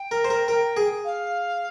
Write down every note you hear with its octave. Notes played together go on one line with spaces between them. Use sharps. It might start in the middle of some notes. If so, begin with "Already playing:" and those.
Already playing: G5
A#4
C5
A#4
A#4
G#4
F5